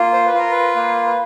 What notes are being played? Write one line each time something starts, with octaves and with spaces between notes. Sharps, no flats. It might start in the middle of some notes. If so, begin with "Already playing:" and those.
Already playing: A#3 F4
C5
B4
F4 A#4
B4
A#3
B4